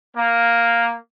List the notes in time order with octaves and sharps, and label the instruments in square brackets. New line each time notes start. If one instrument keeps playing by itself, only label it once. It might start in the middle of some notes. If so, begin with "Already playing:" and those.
[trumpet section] A#3